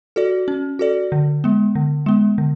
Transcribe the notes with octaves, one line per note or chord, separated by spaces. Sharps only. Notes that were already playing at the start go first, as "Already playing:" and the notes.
F#4 A4 D5
C#4
F#4 A4 D5
D3
G#3 B3
D3
G#3 B3
D3